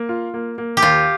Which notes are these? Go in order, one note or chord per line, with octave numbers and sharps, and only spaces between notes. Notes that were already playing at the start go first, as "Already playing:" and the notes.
Already playing: A#3
F4
A#3
A#3
G4
D#2 F4